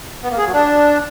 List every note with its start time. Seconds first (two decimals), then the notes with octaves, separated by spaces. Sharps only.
0.23 B3
0.31 A#3
0.38 G#4
0.46 F#3
0.53 D4